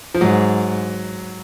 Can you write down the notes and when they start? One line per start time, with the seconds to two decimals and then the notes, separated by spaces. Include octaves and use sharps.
0.14 F3
0.21 G#2 F#3